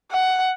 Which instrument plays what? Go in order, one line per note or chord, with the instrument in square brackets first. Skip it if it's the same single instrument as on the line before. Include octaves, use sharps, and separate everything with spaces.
[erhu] F#5